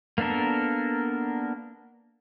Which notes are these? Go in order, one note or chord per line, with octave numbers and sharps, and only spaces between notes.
A#3 B3 D4 A4 A#4